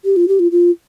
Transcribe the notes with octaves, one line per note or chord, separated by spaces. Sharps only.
G4
F4
G4
F4
F4